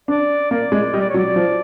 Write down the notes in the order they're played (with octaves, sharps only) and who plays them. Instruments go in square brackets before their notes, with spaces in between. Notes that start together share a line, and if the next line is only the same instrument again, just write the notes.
[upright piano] D4 [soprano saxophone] D5
[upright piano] A#3 [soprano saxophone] D5
[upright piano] G#3
[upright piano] G3 [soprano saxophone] D#5
[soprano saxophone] D5
C#5
[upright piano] F#3
[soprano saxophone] D5
[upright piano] F3